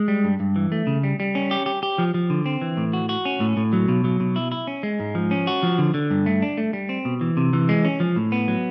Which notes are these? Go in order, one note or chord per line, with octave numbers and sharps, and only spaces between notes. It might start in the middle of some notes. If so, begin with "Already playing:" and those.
Already playing: G#3
G3
G2
G2
E3
A3
C#3
G3
G3
C#4
G4
G4
G4
F3
F3
D3
C4
E3
A2
F#4
F#4
C#4
A2
A2
F#3
B2
F#3
B2
E4
E4
C#4
G#3
G#2
F3
C#4
F#4
F3
D3
D3
G2
A3
D4
A3
G3
C4
B2
E3
C3
E3
G#3
C#4
F3
A2
B3
F#3